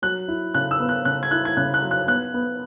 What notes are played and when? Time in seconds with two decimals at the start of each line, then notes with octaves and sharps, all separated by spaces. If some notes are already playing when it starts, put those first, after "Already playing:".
0.02 F#3 F#6
0.28 E4
0.54 C#3 F#6
0.71 E6
0.80 B3
0.89 F#6
1.05 C#3 F#6
1.23 G#6
1.31 E4 F#6
1.45 G#6
1.57 C#3 F#6
1.74 F#6
1.82 F#3
1.91 F#6
2.08 B3 F#6
2.34 B3